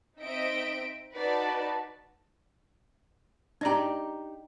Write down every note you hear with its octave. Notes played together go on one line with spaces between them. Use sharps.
C4 D#4 D#5 E5 D7
D#4 F#4 B4 D5 A5
D4 D#4 G4 D5 A#5